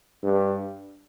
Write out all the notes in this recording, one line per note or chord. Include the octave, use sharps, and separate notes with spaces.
G2